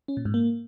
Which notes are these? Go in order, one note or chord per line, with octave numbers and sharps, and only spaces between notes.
C#4
A#2
G#2
A#3